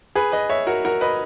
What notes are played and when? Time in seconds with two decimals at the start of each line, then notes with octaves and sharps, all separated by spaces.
0.15 G#4 B4
0.32 B4 D#5
0.50 C#5 E5
0.67 F#4 A#4
0.85 F#4 A#4
1.01 B4 D#5